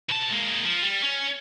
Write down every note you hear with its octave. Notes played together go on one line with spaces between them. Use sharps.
B2 A5
G#3 A#3
F3
G3
C#4